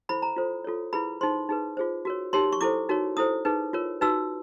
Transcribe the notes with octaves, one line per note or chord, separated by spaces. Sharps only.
E4 A4 C5 B5
A#5
F4 A4 C5
F4 A4 C#5
E4 G#4 B4 B5
D#4 G#4 C5 C6
D#4 G#4 B4
F4 G#4 C5
F#4 A#4 C#5
D#4 G4 A#4 C#5 C6
C#6
E4 A4 C5 D6
D#4 F#4 A#4 C#5
E4 A4 C5 D#6
D#4 G#4 B4
F4 A#4 C#5
D#4 F#4 B4 E6